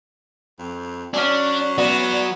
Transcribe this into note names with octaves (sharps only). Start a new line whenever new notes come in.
F2
F#3 C#4 D4 C#5 G#5
F#3 B3 D5